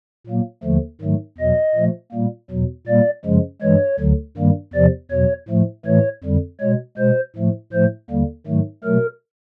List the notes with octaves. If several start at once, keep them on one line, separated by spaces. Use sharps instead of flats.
A#2 F#3 A#3
D#2 D3 F3 A3
G#2 D#3 F#3 A3
E2 B2 F#3 D#5
A#2 F3 A3
A#2 G3 A#3
E2 B2 F#3
A#2 G3 A#3 D5
F#2 C#3 F3 G#3
G2 E3 G#3 C#5
D2 D3 F#3
G2 D#3 G3 A#3
E2 C3 F3 D5
E2 B2 F#3 C#5
A2 F3 A3
A2 E3 A3 C#5
F2 D3 G3
B2 G#3 C#5
B2 G#3 C5
A2 F3 A3
A2 F3 A3 C5
D#2 D3 G3 A#3
G#2 D#3 F#3 A3
B2 F#3 A3 A#4